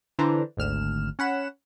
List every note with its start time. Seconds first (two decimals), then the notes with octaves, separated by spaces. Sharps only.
0.19 D3 E3 D4 C5 A#5
0.57 G#1 D2 F6 E7
1.19 C#4 F#5 B5 E7